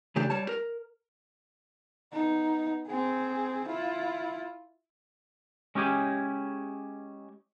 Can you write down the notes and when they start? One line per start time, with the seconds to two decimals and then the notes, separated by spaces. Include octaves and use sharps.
0.16 C#3 E3 A3 D4 G4
0.30 G3 C#5 A5
0.49 A#4
2.12 B3 D#4
2.87 C4 G#4
3.68 E4 F4
5.75 G#3 C#4 E4 G4 G#4